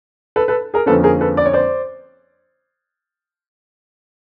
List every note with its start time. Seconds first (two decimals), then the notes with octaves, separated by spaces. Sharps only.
0.36 A4 B4
0.48 A4 B4
0.74 G#4 A#4
0.86 F2 D3 F3 A#3 C#4 A4 B4
1.03 G#4 A#4
1.21 A4 B4
1.37 D5
1.46 C#5
1.53 C5 D5